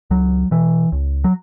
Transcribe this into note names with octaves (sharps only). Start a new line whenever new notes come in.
C#2 F#3
B2 E3
C#2
F#3